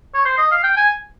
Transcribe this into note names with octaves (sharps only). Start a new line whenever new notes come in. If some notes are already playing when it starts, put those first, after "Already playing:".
C#5
C5
D#5
F5
G5
G#5